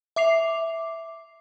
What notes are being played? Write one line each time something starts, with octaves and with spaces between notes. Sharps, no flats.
E5 D6 C7 F7